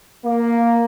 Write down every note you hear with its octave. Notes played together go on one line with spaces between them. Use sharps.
A#3